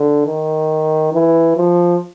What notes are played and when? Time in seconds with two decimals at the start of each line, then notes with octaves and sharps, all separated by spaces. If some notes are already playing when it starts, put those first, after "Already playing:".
Already playing: D3
0.26 D#3
1.13 E3
1.57 F3